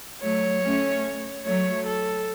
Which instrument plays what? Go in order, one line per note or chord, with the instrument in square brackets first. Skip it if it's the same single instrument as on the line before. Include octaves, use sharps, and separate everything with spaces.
[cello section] F#3 A3 [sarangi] C#5
[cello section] A3 C#4
[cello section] F#3 A3 [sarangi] C#5
[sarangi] A4